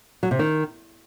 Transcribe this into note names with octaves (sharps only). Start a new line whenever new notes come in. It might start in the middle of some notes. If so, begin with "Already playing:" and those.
F#3
C3
D#3